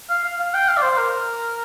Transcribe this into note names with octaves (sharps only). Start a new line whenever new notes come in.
F5
F5
F5
G5
F5
D5
C5
A#4